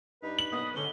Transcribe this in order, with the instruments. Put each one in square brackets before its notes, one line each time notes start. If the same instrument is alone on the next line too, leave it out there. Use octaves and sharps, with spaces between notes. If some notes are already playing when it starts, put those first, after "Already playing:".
[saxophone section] G2 D4 D#4 [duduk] B4
[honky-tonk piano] F#7
[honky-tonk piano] B1 B3 [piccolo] D#6
[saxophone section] G#2 C#4 [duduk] D3 [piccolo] G7